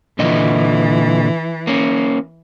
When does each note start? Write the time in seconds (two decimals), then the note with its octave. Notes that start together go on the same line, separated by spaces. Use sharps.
0.19 A#2 D3 E3 D#5
1.67 A#3 C#4